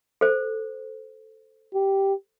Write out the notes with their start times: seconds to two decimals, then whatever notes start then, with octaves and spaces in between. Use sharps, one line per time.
0.21 A4 C5
1.74 G4